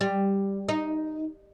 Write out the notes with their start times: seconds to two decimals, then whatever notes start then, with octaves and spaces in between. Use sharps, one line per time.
0.01 G3
0.69 D#4